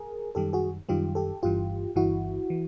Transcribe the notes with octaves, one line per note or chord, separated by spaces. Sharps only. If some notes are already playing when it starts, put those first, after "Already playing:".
Already playing: G#4 A#4
F#2 D#3 G3 G4 A4
F#4 G#4
F#2 D#3 G3 F4 G4
G4 A4
G1 G2 E3 F4 G4
G1 G2 E3 E4 F#4
E3